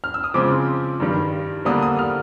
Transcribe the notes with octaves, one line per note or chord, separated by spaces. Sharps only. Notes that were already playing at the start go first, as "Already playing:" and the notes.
F6
E6
D#6
C#3 F3 G#3 C4 D6
G2 D#3 G3
D3 G3 A#3 D4 D#6
D#6
F6